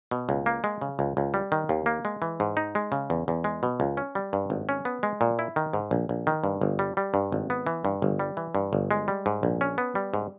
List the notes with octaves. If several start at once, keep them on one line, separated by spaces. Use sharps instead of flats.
B2
C#2
A#3
G#3
C#3
C#2
C#2
G3
D#3
D#2
A#3
G#3
E3
G#2
D#4
G#3
C#3
E2
E2
G#3
B2
C#2
C#4
G3
G2
G#1
C#4
B3
G#3
A#2
E4
D#3
G#2
A#1
A#1
D#3
G2
G1
G3
G3
G2
G#1
B3
E3
G2
G1
G3
E3
G2
G1
G#3
G3
G#2
A#1
C#4
B3
G3
G#2